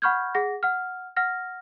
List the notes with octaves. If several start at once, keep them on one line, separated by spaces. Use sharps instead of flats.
F#5 B5 C#6 F6 G6 G#6
G#4 F#5 A#6
F#5 F6
F#5 F6 A#6